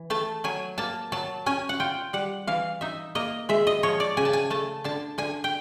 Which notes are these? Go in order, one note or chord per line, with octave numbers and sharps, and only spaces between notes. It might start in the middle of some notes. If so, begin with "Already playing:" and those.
Already playing: E3
A3 A5
F#3 G#5
A#3 A5
F#3 A5
C#4 G#5
F#5
F4 G5
G3 F#5
E3 F5
D#4 E5
A#3 D#5
G#3 E5
D#5
F3 C#5
D5
C#3 G#5
A5
G#5
A3 A5
D3 A5
D3 G#5
G5